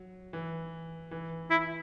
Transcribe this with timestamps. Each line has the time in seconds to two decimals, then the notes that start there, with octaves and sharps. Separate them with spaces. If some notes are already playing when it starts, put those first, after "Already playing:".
Already playing: F#3
0.33 E3
1.11 E3
1.50 E4